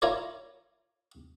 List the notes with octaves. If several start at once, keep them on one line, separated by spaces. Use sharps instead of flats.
E4 F4 A#4 C#5 D5